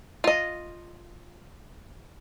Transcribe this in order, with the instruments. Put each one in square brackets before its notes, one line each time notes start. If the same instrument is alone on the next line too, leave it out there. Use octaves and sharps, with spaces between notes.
[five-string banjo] F4 D#5